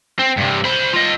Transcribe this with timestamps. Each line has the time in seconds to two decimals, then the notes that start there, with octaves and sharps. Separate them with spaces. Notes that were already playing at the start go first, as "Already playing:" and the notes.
0.19 C4
0.37 G2 C3
0.65 C5 B5
0.93 F4 D#5